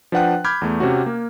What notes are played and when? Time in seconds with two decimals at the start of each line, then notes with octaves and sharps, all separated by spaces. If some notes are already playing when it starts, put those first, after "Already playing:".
0.12 F3 D4 B4 F#5 G5 F#6
0.44 B5 D6 F6 G6 G#6
0.62 E2 A3
0.80 C3 C#4 F#4
1.06 A#3